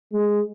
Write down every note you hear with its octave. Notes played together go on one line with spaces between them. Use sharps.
G#3